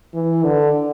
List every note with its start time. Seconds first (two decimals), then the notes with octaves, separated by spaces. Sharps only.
0.14 E3
0.43 D3